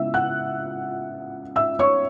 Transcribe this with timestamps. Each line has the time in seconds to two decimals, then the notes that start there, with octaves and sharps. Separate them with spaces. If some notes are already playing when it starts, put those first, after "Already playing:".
Already playing: C#3 G#3 B3 E4 E5 E6
0.14 F#5 F#6
1.56 E5 E6
1.79 C#5 C#6